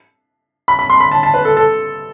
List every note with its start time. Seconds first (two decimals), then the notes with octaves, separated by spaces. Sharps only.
0.68 B5
0.79 B5
0.90 C6
1.00 B5
1.11 A5
1.23 A5
1.34 B4
1.45 A4
1.57 A4